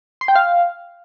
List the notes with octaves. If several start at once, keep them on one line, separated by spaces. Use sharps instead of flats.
C6
G5
F5